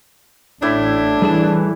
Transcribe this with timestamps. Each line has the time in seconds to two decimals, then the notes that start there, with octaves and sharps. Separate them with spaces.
0.62 A1 A2 D4 E4 D5
1.22 E3 G3 G#4 A5